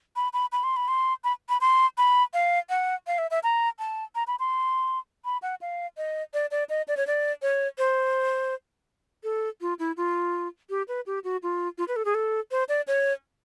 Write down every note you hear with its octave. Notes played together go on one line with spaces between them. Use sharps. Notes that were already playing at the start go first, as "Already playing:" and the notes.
B5
B5
B5
C6
B5
C6
B5
B5
C6
B5
F5
F#5
F5
E5
E5
A#5
A5
A#5
B5
C6
B5
F#5
F5
D#5
D5
D5
D#5
D5
C#5
D5
C#5
C5
A4
F4
E4
F4
G4
B4
G4
F#4
F4
F4
B4
A4
G#4
A4
C5
D5
C#5